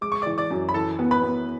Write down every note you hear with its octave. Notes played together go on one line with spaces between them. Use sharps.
G#3 D6
C#6
D5 D6
E3
D5 D6
F#2
B5
E3 A4 A5
B3
B4 B5
B3